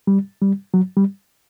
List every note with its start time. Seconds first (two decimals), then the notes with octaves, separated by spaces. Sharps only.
0.07 G3
0.41 G3
0.74 F#3
0.97 G3